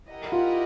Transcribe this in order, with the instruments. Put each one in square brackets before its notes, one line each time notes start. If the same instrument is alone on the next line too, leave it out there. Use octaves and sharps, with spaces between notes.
[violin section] E4 G4 A#4 D#5 F#5
[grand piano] F4